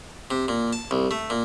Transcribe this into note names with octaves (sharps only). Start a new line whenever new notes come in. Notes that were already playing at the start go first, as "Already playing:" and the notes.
C3
A#2
A5
C2
A3
A#2